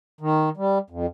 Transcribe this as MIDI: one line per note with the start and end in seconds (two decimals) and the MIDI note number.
0.21 0.49 51
0.57 0.78 55
0.90 1.06 41